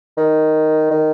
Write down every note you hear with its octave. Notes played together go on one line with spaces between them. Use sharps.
D#3
D#3